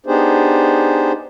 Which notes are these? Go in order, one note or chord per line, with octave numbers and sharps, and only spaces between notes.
B3 D4 D#4 G4 G#4 C5